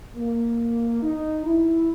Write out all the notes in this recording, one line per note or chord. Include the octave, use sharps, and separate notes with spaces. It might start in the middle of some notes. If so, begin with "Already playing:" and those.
A#3
D#4
E4